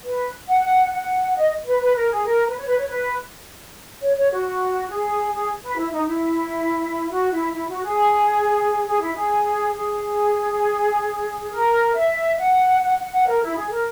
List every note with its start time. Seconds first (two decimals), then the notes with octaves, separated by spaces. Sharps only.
0.05 B4
0.49 F#5
0.93 F#5
1.37 D#5
1.66 B4
1.81 B4
1.96 A#4
2.11 G#4
2.25 A#4
2.47 B4
2.57 C#5
2.67 B4
2.78 C#5
2.88 B4
4.01 C#5
4.16 C#5
4.31 F#4
4.89 G#4
5.33 G#4
5.63 B4
5.77 E4
5.92 D#4
6.07 E4
7.10 F#4
7.32 E4
7.54 E4
7.69 F#4
7.83 G#4
8.86 G#4
9.01 E4
9.15 G#4
9.74 G#4
11.51 A#4
11.94 E5
12.38 F#5
12.82 F#5
12.97 F#5
13.12 F#5
13.27 A#4
13.41 E4
13.56 G#4
13.70 A#4